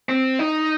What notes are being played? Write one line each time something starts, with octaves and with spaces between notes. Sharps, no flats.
C4
D#4